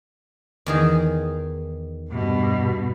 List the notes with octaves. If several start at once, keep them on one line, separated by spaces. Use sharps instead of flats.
E2 D#3 G#4
G2 B2